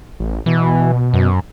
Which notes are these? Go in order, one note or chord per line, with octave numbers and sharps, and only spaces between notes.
A1
B2 E3
F#2